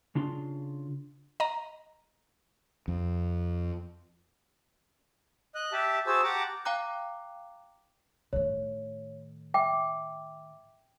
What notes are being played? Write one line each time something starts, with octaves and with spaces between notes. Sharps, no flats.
C#3 D4 F4 C6
D#5 A#5
F2
D#5 F#6
G4 E5 A5
F#4 G#4 C5 A5 E6
G4 F#5 A5 A#5 D6
F5 G5 A#5 D6 F#6
A2 D#3 C#5
E5 G5 D6